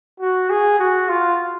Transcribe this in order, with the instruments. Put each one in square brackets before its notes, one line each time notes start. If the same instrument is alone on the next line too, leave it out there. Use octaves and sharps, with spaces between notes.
[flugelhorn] F#4
G#4
F#4
F4